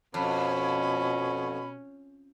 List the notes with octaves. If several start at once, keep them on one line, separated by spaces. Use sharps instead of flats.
F2 B2 C#4 B5